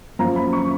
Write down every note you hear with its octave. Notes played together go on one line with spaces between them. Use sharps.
F#2 F3 A#3 F4 A#5
B5
C#6